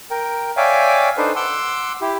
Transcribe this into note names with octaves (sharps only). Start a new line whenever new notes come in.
A#4 G5
C#5 D5 E5 F5 G5 G#5
D4 D#4 A4 B4 C5
F#5 C6 D6 E6
E4 G4